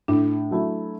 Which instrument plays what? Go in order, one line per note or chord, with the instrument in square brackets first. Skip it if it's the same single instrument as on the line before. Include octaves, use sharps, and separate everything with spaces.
[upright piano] A2 [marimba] D4
[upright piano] F#3 A3 E4